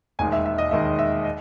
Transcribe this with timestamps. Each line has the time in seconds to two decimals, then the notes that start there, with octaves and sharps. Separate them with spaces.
0.19 E1 D#2 D#3 G#3 G#5
0.32 E5
0.46 E5
0.58 D#5
0.71 E1 D#2 D#3 G#3 E5
0.99 E5
1.25 D#5